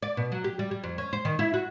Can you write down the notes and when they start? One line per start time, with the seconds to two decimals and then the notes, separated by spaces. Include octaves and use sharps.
0.02 D5
0.17 B2
0.32 F#3
0.44 G4
0.59 G3
0.71 G3
0.84 F2
0.98 C#4
1.13 C5
1.25 D#3
1.39 E4
1.54 F#4